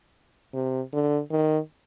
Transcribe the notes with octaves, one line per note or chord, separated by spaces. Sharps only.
C3
D3
D#3